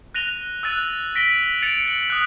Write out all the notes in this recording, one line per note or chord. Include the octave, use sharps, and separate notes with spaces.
F#6 A#6 D#7 F7 G7
E6 F#6 A6 D#7
A#6 B6 D7 F#7 G7
A6 C#7 D7 F7
D7 F#7
D#6 F#6